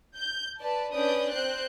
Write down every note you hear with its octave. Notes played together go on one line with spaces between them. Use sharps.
G6
B4 D5 A5
C#4 D4 B4 D5 D#6 G6
C4 C5 F#6 G6